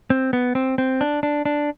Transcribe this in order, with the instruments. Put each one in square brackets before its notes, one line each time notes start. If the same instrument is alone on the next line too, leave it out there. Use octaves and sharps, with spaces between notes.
[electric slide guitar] C4
B3
C4
C4
D4
D4
D4